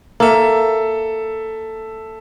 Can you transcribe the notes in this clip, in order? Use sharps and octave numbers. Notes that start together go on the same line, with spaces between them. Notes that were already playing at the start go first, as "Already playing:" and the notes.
A#3 A4 E5